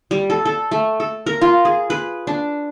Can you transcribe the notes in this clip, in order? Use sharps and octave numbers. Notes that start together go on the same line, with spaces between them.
G3
A4
A4
A3
A4
A#4
F4
G#4
B4
D4